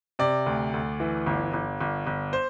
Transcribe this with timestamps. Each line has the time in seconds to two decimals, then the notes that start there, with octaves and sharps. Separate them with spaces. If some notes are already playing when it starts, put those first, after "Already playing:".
0.19 C3 D5
0.46 D2
0.74 D2
1.00 E3
1.27 G1
1.53 G1
1.81 G1
2.07 G1
2.33 C5